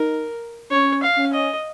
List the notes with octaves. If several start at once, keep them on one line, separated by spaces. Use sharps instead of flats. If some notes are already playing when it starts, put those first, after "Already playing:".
Already playing: D#4 A#4
C#4 C#5
F5
C#4
D#5